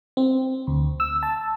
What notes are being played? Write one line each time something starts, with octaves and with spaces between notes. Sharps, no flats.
C4
D2
E6
A5